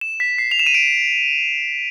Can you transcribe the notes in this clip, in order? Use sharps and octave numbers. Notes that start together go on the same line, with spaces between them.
E7
B6
C7
F7
E7
D#7
D7